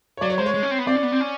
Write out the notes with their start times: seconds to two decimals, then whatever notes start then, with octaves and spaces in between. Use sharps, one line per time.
0.17 C#5
0.21 F#3 D5
0.30 C#5
0.38 G#3 C5
0.46 C#5
0.54 G#3
0.63 C#4
0.71 C4
0.78 B3
0.87 C4 D5
0.95 C#4
1.03 B3
1.12 C4
1.20 C#4